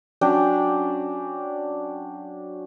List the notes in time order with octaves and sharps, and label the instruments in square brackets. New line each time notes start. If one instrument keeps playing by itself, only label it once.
[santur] F#3 C#4 D4 G5